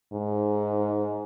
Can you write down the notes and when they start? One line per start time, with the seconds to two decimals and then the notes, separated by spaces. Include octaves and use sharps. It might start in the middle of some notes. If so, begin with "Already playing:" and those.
0.13 G#2